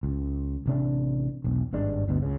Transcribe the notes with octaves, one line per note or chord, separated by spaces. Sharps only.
C#2
A1 C3 D4
E1 B1
G#1 G2 G#3 D4
G1 D2 B2
C#2 C#3